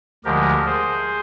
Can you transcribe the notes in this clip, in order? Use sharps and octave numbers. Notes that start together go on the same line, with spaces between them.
D2 D3 F3 G#3 G4 A#4
G#4 C5